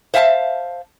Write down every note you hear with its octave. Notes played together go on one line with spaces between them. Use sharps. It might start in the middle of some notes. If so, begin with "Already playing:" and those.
C5 E5 F5 G#5 A5